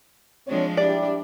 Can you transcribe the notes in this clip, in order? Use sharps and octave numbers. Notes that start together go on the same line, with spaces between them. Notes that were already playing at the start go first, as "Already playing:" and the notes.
F3 G#3 C4 D4 C#5
G3 D4 E4 G4 D5